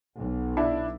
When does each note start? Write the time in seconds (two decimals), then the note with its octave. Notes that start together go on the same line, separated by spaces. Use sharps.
0.18 B1
0.57 D4 E4